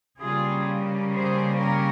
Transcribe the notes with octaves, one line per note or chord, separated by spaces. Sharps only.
C#3 G3 A#3 C#4 F4 G#4
G#4 C5
A#4 C#5